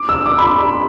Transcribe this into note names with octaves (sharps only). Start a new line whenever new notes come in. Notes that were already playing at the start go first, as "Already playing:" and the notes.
Already playing: D6
E6
D6
B5
C6
B5